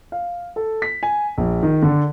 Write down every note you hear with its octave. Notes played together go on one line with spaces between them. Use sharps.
F5
A4
B6
G#5
A#1
D#3
D3